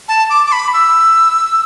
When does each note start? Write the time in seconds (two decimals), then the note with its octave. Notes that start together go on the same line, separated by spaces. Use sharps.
0.08 A5
0.30 D6
0.46 D6
0.52 B5
0.74 E6